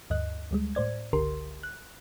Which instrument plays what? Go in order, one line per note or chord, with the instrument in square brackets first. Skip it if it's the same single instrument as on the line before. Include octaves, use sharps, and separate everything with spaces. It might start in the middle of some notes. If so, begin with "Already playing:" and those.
[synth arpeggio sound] D2 G2 D#5 F#6
D2 G3 G#3
A2 C5 D5 G#6
G1 C#2 D3 G4 A#4 C6
F#6